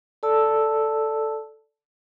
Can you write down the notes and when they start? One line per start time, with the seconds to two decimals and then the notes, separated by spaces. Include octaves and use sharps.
0.23 A4 D5 A5 E6